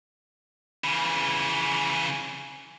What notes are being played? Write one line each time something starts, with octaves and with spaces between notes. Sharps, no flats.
C#3 E3